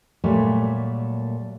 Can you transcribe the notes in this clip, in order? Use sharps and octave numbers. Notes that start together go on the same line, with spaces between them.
A#2 F#3 G3 A3